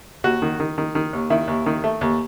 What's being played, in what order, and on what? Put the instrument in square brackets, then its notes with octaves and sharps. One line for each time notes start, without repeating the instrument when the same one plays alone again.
[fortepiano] D#2 F#4
D#3
D#3
D#3
D#3
D#2
D#3 E4
D#2
D#3
A3
D#2